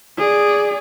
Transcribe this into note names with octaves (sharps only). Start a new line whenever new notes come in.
G#4 D5